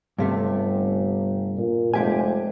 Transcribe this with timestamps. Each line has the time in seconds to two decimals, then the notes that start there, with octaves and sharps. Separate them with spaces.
0.18 G1 G2 C3 A3
1.57 A#2
1.94 F1 G#3 G4 G#5